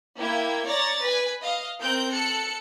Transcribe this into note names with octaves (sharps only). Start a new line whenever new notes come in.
A#3 E4 G5 G#6
C#5 D5 A#5 A6 A#6
B4 G#5
D#5 F5
C4 A#4 G6 D7
A4 F#6 C#7